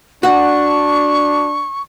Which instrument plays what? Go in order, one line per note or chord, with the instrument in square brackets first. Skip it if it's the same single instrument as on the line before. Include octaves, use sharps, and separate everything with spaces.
[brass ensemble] D4 [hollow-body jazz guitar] F#4 F#5 [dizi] C#6